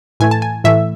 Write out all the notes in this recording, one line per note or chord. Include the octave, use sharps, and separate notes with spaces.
A2 E3 A3 G#5
A5
G#5
A2 E3 A3 E5